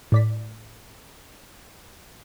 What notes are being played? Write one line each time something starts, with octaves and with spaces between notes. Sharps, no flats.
A2 D5 B6